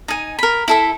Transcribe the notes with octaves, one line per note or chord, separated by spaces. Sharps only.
D#4 G#5
A#4 B5
E4 A4 E5